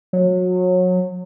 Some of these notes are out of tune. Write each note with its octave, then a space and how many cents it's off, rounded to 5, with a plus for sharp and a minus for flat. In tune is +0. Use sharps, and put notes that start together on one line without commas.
F#3 -25